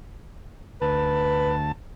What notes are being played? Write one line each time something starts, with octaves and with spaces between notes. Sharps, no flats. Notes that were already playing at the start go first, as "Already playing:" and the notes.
D2 B4 A5